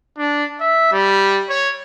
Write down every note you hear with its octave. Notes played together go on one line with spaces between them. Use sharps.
D4
E5
G3
C#5